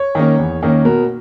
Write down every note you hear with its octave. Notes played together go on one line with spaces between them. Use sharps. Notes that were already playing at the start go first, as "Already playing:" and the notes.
Already playing: C#5
D#3 A#3 C#4
E2
D#3 A#3 C#4
B2 A#4